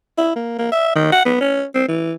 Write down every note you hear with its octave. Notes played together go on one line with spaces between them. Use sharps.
E4
A#3
A#3
E5
D#3
F#5
B3
C#4
C4
E3